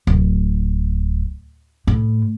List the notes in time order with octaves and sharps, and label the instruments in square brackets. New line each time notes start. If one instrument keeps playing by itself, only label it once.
[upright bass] D1
A2